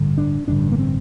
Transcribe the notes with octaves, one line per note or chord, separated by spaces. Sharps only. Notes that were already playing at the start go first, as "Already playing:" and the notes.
Already playing: A1 G2 D3
D4
A1 G2 D3 D4
A#3
C4